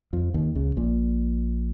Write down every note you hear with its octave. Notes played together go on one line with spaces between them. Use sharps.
F2 F3
D#2 D#3
C#2 C#3
A#1 A#2